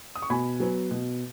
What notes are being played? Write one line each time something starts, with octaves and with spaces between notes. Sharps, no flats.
D#6
C#6
B2 G#5 B5
F#3 B3
B2